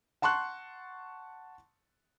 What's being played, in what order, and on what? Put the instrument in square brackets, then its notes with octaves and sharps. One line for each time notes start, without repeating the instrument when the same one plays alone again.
[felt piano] F#5 A5 C6 C#6 F#6